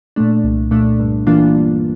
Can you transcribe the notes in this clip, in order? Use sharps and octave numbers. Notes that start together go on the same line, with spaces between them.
A#2 A3 D4
C2
A#2 A3 D4
G2
E3 A#3 D4 F4
G2